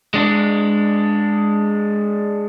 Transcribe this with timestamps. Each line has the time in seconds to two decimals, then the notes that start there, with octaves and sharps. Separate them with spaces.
0.14 G#3 D4